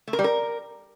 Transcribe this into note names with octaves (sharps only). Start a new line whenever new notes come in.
A3
A#4
G3
A#4